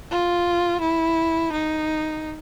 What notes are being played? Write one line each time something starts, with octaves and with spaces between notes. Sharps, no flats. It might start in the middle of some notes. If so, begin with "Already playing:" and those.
F4
E4
D#4